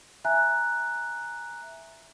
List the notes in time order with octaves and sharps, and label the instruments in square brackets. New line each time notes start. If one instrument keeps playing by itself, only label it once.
[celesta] E5 G#5 A#5 F#6